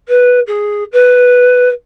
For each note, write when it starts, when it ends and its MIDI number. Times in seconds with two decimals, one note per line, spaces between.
0.08 0.40 71
0.47 0.84 68
0.92 1.69 71